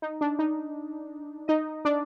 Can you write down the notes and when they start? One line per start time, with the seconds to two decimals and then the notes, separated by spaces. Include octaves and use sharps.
0.02 D#4
0.21 D4
0.39 D#4
1.48 D#4 D#5
1.85 D4 D5